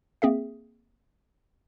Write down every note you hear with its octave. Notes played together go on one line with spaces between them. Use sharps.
A#3 C4 G#4 E5